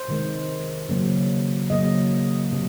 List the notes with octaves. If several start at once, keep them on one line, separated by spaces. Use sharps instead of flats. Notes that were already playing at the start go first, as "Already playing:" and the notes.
Already playing: C5
C3 D#3 G#3
C#3 F#3 A#3
C#3 F#3 A#3 D#5
C3 F#3